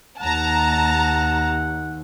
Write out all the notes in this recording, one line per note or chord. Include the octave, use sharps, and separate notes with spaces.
D#2 F#5 A5 A#5